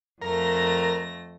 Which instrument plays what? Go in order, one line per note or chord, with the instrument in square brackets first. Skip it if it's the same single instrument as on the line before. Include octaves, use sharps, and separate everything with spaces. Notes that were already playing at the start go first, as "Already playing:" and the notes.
[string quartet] F2 A3 A#6 [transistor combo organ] A#4